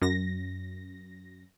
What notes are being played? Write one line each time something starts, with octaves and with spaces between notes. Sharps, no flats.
F#2 A#6